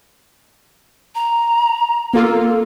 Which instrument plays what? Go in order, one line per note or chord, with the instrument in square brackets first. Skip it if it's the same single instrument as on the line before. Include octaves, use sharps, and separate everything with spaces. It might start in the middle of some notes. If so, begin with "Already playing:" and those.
[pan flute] A#5
[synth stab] A#3 F4 [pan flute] A4